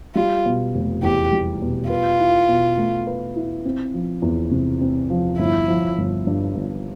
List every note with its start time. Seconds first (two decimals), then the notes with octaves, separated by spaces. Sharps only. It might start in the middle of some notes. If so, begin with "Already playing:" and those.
0.15 G3 F4
0.46 B2
0.75 F1
1.03 E2 G4
1.33 G3
1.62 B2
1.90 F4 B4
2.19 E4
2.49 B2
2.77 A3
3.07 B4
3.36 E4
3.65 C4
3.94 F3
4.22 E2
4.51 C3
4.81 C4
5.10 F3
5.39 G1 E4
5.68 F3
5.98 G1
6.27 G2
6.55 G1